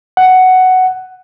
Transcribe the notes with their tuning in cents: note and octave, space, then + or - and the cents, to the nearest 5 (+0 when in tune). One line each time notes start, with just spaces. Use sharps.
F#5 +5